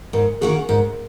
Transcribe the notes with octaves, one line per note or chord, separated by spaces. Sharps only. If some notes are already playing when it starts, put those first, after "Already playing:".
G#2 A#4
D#3 A#3 C#4 F#4 G#4
G#2 A#4